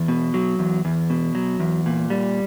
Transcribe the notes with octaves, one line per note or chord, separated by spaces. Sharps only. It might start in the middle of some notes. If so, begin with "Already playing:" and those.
Already playing: E2
B2
F#3
E2
E2
B2
F#3
E2
A#2
G3